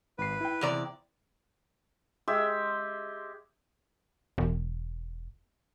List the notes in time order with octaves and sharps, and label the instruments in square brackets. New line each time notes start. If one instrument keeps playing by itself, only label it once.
[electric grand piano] G#1 C7 [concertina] B4
[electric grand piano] E4 G5
[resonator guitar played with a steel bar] E2 C3 D5
[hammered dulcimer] G#3 G4 E5
[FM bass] E1